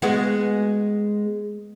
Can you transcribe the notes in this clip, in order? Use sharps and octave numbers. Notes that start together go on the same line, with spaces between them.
G#3 B3 F#4